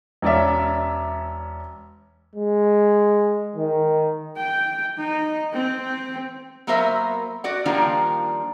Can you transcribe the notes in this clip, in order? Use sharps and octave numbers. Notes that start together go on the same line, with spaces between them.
E1 C#4 D5 E5
G#3
D#3
G5
D#4
C4
F#3 A#3 B3 A#4 C5 E5
F#4 D5 F#5
D#3 F3 G3 A#3 D4 F4